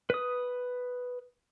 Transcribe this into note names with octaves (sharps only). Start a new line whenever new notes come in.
B4 D#6